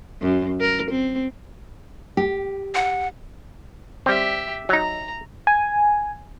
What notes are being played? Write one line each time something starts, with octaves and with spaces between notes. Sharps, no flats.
F#2
A#4
C4
G4
F#5
G3 C4 G4 E5
F#3 D#4 A#5
G#5